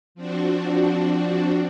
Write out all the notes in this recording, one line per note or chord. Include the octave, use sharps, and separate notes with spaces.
F3 C4 D4 F#4